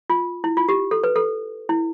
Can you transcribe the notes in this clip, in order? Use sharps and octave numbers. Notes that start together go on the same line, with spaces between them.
F4
E4
F4
G4
A4
B4
A4
E4